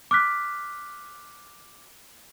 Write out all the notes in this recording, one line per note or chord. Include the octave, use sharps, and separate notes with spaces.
D6 F6 F#6 B6